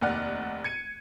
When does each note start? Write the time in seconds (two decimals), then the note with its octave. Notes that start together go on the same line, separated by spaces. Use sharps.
0.01 F1 D#2 D5 F#5 F6 F#6
0.64 G#6 C#7 D#7